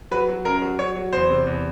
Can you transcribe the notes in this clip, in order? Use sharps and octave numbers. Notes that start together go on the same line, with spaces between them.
F#3 B4
F#3
F#2 A#4
F#3
F#3 C#5
F#3
E2 C5
C3
E2